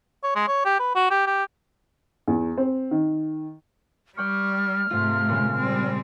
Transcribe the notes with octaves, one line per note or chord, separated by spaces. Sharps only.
C#5
G#3
C#5
G4
B4
F#4
G4
G4
E2
C4
D#3
G3 D5 G5 C#6 F6
G#2 C3 A3 F4
A#2 C#3 G#3
G3 C4